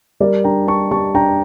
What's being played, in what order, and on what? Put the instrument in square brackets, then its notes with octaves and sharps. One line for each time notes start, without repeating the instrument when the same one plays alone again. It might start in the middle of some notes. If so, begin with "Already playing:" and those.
[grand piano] G3 A#4 D5
D4 G5 A#5
D4 A5 C#6
G3 A5 C#6
D4 G5 A#5